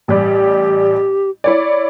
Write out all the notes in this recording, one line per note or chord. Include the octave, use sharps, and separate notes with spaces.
A1 G3 G4
E4 C#5 D5